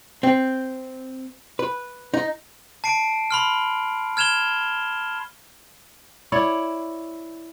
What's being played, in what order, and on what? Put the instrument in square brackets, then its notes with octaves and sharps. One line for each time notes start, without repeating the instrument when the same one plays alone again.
[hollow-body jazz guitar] C4
B4
D#4
[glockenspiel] A5 C7 D7
B5 C6 F6
F6 G#6 E7 F7 G7
[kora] E4 C#5 D5